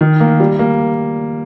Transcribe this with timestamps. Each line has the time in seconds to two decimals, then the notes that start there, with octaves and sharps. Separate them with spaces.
0.01 D#3
0.20 A#3
0.40 G3
0.59 A#3